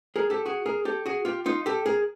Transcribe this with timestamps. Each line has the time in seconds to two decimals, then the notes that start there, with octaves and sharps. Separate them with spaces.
0.16 G#4 A#4
0.30 G4 A4
0.46 F#4 G#4
0.66 G#4 A#4
0.85 G4 A4
1.06 F#4 G#4
1.25 F4 G4
1.46 D#4 F4
1.66 G4 A4
1.86 G#4 A#4